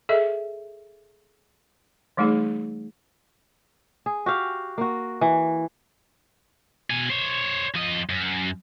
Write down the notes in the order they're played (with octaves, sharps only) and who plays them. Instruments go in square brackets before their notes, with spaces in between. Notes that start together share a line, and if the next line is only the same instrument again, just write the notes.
[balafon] G#4 A4 D#5 E5
E3 G3 A3 D#4 G#4
[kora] G#4
F#4 G4 F5
A#3 F#4
E3
[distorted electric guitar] B2 G#5
C5 C#5
F2 D#5
F#2